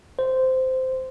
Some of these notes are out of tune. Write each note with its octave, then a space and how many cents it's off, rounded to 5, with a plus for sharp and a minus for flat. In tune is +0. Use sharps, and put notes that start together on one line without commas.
C5 -10